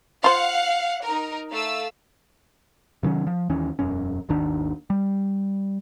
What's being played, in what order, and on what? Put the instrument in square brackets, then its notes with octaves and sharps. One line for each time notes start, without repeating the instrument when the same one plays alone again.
[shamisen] F4 C5 [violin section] F5 F#5
[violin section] D#4 A#4
A3 F5 E6
[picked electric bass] C3 D#3 F#3 C#4
F3
D#2 D#3 E3 C#4
E1 F#2 C#4
G#1 D#2 D#3 D4
G3